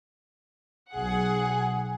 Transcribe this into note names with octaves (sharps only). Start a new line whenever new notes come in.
B1 G#4 F#5